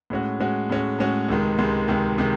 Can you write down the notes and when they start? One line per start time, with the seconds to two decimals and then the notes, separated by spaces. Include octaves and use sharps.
0.10 A2 G#3 C#4 F#4
0.39 A2 G#3 C#4 F#4
0.70 A2 G#3 C#4 F#4
0.99 A2 G#3 C#4 F#4
1.29 C#2 C3 D#3 G#3
1.58 C#2 C3 D#3 G#3
1.88 C#2 C3 D#3 G#3
2.18 C3 D#3 G#3